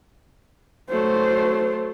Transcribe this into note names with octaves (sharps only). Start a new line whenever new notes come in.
F#3 A3 C5